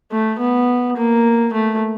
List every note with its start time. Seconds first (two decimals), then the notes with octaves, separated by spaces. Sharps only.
0.11 A3
0.39 B3
0.97 A#3
1.53 A3